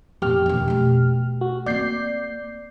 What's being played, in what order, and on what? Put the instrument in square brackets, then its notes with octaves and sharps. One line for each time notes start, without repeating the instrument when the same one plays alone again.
[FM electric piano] F2 G4 F6 [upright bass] A#2
[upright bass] E1 D#2
B2 A3
[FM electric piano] F#4
[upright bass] A#3 C4 [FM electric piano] D5 G6 C7